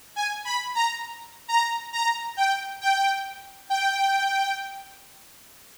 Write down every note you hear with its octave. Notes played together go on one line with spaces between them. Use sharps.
G#5
B5
A#5
A#5
A#5
G5
G5
G5